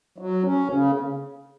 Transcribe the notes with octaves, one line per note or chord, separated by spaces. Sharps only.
F#3
C#4
C#3